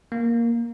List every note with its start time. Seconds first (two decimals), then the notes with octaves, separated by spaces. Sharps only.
0.12 A#3